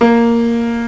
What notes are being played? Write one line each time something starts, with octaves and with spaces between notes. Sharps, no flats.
A#3